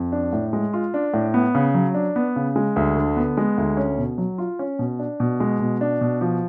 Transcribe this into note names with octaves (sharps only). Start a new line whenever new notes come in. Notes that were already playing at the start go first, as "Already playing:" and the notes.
Already playing: F2
D4
A2
G#3
F4
D4
A2
B3
C#3
F#3
D4
B3
C#3
G#3
D2
D3
B3
G#3
D2
C#4
B2
F#3
F4
C#4
B2
D4
B2
G#3
B2
D4
B2
F3